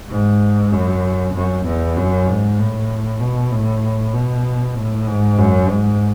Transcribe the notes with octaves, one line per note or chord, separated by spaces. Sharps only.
G#2
F#2
F#2
E2
F#2
G#2
A2
B2
A2
B2
A2
G#2
F#2
G#2